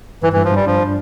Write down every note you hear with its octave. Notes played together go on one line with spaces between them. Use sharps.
G2 E3
G2 E3
F3
G2 G3
F3 D4
D4